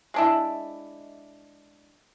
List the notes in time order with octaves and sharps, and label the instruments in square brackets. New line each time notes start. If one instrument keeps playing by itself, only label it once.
[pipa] G#3 D4 E4